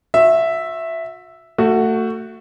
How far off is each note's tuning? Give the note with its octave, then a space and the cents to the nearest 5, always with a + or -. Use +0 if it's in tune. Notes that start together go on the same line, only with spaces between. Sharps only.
F#4 -40 E5 +0
A3 +25 F#4 +0